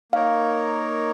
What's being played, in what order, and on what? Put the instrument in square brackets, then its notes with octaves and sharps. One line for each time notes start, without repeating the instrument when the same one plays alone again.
[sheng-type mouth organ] A#3 D#4 A#4 C#5 [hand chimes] F5